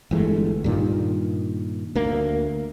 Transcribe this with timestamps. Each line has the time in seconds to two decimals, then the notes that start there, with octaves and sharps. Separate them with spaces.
0.11 G1 E3 G#3 A3
0.64 G2 A#2 D#3
1.95 D2 A#3